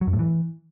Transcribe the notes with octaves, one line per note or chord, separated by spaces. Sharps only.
F#3
F#2
A2
E3